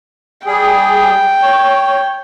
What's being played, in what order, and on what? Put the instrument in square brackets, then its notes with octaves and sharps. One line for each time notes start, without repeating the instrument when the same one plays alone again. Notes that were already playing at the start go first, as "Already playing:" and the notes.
[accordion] G3 G#4 [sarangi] G5
[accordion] C#5